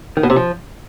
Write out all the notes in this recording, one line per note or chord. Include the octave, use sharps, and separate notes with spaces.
D#3
B2
C3
F3